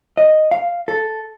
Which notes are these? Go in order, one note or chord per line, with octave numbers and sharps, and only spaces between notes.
D#5
F5
A4